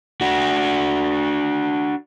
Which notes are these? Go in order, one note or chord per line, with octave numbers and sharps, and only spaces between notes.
D4 F#4